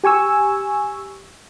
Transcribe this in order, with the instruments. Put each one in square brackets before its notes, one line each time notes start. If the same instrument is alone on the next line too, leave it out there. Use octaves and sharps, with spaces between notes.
[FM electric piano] G4 G#5 C#6 E6